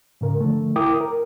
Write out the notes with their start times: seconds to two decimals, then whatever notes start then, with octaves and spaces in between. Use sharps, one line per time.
0.21 G#2 C#3 A#4
0.41 D3 F3 A3
0.76 E4 A#4 G5 D6 D#6
1.01 A#4